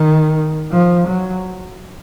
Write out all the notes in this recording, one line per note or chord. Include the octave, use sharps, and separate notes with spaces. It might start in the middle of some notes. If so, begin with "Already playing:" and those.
Already playing: D#3
F3
F#3